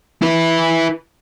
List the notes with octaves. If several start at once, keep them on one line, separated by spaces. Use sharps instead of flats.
E4 B4